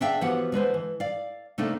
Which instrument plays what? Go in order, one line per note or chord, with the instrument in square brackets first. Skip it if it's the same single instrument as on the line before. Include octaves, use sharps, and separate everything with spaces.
[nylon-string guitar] D3 D4 G#4 E5 F5 G5
E3 F3 B3 F#4 G4 F#5
D3 G#3 B4 C5
E3
D5 F5
C3 A3 A#3 D4 D#4 A4